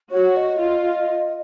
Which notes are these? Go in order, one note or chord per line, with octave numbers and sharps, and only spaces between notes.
F#4 C#5
D#5
F4